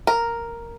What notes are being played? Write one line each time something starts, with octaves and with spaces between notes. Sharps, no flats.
A#4